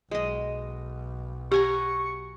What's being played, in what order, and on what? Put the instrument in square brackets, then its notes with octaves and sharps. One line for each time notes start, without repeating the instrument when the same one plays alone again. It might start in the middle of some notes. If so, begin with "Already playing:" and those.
[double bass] B1 [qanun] G#3 D#5
[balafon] G4 [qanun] F#5 G#5 A#5 [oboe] C#6